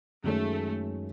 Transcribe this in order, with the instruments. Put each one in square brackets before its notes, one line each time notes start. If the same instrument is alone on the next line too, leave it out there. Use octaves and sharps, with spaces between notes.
[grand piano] F#2 D#3 G#3 C#4 [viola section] A3